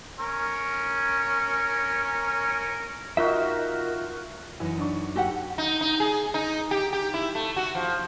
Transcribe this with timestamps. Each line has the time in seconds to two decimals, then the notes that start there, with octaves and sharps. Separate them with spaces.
0.19 C#4 A#4
3.17 D#4 F4 F#4 A#4 E5
4.60 F#2 E3 D#4
4.78 D4 C#6
5.16 F#4 G4 A4 F#5
5.58 D#4
5.81 D#4
6.00 G#4
6.34 D#4
6.71 G4
6.93 G4
7.14 E4
7.35 A3
7.56 F#4
7.75 F3